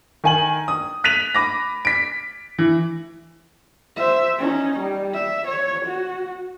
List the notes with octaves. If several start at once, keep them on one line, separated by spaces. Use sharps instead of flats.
D#3 G#5 F#7
D#6
F#6 B6 D#7 F7
B5 D6 A#6
B6 D7
E3
C5 E5
C#4 D#4
G3
E5
C#5
F#4